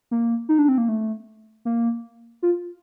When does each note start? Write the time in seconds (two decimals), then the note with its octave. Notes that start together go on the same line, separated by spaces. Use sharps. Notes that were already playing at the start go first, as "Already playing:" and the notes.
0.11 A#3
0.49 D#4
0.59 D4
0.69 C4
0.78 A#3
0.89 A3
1.65 A#3
2.42 F4